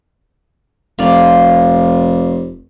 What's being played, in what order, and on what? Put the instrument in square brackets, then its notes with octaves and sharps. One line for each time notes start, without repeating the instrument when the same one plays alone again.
[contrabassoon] F1 [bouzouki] F4 D5